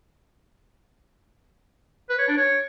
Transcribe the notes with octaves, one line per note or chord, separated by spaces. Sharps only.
B4
C#5
D4
C#5